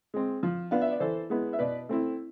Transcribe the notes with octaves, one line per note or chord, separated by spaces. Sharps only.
G#3 C4
F3
B3 D4 F4 F5
E5
D5
E3 A4 C5
G#3 B3 E4
E5
B2 B4 D5
A3 C4 E4